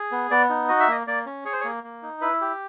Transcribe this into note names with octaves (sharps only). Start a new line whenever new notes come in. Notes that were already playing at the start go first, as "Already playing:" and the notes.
Already playing: G#4
B3
B3 D5
D#4
F#4 D#5
E5
A#3 D#5
A#3 D5
C#4
G#4 C#5
C5
C#5
A#3
A#3
D#4
E4 B4
G4